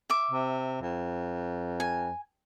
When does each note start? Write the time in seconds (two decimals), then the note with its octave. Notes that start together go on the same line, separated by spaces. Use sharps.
0.10 E5 D6
0.31 C3
0.81 F2
1.80 G#5